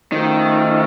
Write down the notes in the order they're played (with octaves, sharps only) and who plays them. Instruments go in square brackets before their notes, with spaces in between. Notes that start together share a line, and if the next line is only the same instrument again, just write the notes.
[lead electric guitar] D#3 [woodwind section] F3 A3 C#4 F#4 A4